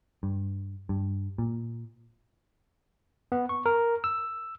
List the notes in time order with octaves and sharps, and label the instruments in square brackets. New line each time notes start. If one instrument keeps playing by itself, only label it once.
[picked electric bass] G2
G2
A#2
[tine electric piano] B3
C#6
A#4
E6